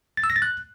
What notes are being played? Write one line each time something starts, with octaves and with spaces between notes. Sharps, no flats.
A6
E6
A#6
A6
F#6